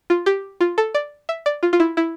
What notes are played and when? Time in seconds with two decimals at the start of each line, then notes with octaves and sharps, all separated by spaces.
0.10 F4
0.26 G4
0.61 F4
0.78 A4
0.95 D5
1.29 E5
1.46 D5
1.63 F4
1.73 F4
1.80 E4
1.97 E4